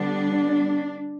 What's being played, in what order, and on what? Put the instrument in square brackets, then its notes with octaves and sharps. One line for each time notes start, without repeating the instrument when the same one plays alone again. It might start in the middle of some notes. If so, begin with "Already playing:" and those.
Already playing: [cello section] D3 G3 B3 D4